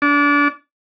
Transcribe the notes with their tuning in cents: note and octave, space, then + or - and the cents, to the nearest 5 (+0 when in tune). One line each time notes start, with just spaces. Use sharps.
D4 -30